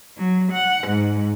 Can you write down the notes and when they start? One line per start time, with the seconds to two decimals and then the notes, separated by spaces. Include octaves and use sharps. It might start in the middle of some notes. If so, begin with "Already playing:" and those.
0.17 F#3
0.52 F#5
0.88 G#2